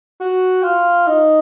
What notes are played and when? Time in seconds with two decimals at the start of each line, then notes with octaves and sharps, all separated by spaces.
0.20 F#4
0.63 F4
1.07 D#4